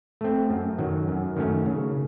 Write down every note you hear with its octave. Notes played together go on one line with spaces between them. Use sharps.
A3 C4
F#2
D#3 F#3
F#2
D#3 F#3 A3 C#4
C#3